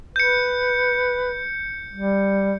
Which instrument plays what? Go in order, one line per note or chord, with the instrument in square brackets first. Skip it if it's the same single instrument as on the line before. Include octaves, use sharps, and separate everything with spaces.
[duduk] B4 [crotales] G6 C#7
[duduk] G3